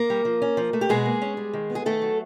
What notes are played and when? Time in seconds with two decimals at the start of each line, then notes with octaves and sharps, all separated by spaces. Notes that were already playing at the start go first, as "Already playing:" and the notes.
Already playing: A#3 A#4
0.10 G3
0.25 F3
0.42 C#4
0.57 F3
0.73 A3
0.81 G4
0.89 B2 G#3 G#4
1.06 A#3
1.22 C#4
1.37 G3
1.53 D#3
1.70 B3
1.75 G#4
1.86 D#3 A3 A4
2.02 F#3